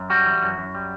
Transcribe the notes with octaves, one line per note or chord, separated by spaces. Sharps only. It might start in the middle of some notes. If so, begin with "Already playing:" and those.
Already playing: F#2
G3 F#4
E3
F#2
F#2
G3